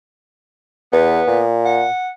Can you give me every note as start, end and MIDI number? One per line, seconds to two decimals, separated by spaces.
0.93 1.22 40
0.93 1.43 59
1.28 1.86 46
1.66 2.10 78